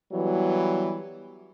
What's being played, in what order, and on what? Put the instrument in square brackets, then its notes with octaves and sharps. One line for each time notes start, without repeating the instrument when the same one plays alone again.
[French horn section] E3 F#3 G3 B3